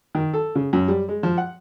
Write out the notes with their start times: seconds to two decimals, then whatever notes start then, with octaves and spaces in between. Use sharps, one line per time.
0.15 D#3
0.34 A4
0.55 C#3
0.73 F#2
0.88 G3
1.09 G#3
1.23 F3
1.38 F#5